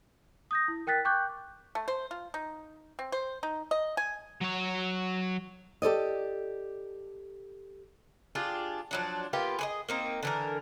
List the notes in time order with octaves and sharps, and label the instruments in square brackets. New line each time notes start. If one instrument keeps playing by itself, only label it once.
[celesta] D#6 G6 A#6
E4
A#4 G5 F#6 A6 B6
G5 C#6 D6 F#6 G6
[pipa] A3
C5
F4
D#4
C4
C5
D#4
D#5
G#5
[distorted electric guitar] F#3 C#5
[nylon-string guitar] G4 A4 D5 D#5
[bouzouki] D4 F4 G4 G#4
F3 F#3 D4
A#3 B3 F4 G4
G#4 B4 D#5
A#3 C4 D#4
D3 E3 A#4